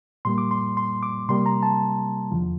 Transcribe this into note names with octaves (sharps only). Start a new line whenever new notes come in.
A#2 G3 A#3 C6
D6
C6
C6
D6
C3 G3 A#3 C6
A#5
A5
E2 D3 F3